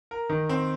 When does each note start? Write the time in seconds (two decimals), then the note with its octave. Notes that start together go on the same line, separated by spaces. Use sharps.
0.11 A#4
0.30 D#3
0.49 C4